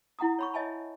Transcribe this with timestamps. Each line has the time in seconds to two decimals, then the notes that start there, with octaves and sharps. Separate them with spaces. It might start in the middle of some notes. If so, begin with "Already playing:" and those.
0.19 E4 F#5 A#5 D#6
0.39 C#5 B5 C#6
0.54 C#5 D#5 E5 G#5 A5 B5